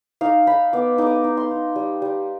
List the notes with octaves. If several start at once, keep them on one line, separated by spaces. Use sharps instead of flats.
D#4 F5
D#4 B5
B3 D6
D#4 D6
D#6
D6
D#4
C6
D#4
G3
G3